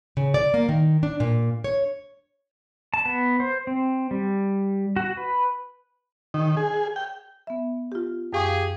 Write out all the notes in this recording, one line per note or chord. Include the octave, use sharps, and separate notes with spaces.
C#3
D5
A#3
D#3
D4
A#2
C#5
A5
B3
C5
C4
G3
F#4
B4
D#3
G#4
G5
B3 E5
F4 G4
F#2 G4 G#4 F5 C#6